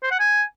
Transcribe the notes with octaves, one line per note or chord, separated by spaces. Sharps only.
C5
F#5
G#5